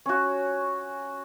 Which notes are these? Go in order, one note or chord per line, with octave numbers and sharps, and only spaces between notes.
C#4 F#4